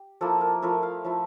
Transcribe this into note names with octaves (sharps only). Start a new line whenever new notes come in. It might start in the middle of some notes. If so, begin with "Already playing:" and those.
Already playing: G4
F3 A#3 E4 A4
A#4
F3 A3 E4 A#4
F5
F3 A3 E4